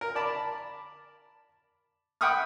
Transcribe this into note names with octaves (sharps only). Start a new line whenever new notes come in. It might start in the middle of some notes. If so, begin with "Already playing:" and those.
A#4
D5 A5 B5
F#5 G5 B5 C#6 D#6 F6